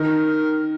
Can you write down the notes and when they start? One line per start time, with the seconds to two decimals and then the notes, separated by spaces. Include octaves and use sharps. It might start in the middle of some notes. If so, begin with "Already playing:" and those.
Already playing: D#3 A#4